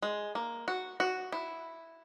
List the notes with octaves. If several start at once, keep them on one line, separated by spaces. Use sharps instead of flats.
G#3
A#3
F#4
F#4
E4